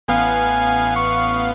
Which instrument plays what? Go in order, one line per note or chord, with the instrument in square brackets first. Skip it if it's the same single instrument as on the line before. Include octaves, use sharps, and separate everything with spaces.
[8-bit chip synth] A1 B3 F5 [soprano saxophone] G#5
[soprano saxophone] C#6